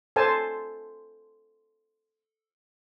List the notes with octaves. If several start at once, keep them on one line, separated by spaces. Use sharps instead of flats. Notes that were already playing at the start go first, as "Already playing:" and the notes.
A4 C5 G#5 A5